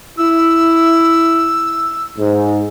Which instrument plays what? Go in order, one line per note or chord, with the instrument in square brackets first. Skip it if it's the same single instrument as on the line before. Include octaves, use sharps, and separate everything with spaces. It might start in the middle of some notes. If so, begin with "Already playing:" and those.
[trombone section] E4 [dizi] E6
[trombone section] G#2